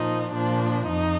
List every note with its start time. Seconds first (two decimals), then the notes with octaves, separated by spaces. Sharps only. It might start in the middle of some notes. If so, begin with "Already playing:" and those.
Already playing: A#2 F3 D#4
0.32 A#2 F3 D4
0.88 F2 D#4